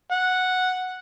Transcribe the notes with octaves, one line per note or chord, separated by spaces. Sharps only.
F#5